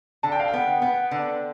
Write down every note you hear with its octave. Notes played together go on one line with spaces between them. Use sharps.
D3 A5
G5
F5
G5
B3
B3
D3